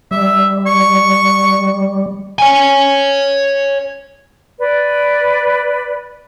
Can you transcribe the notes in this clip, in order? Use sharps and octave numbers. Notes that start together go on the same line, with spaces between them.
G3 E5
C#6
C#5 G#5
B4 D5